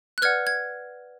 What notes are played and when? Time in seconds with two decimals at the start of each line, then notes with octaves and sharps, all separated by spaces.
0.18 F#6
0.22 B4 D5 F#5 F6 G#6
0.47 G#6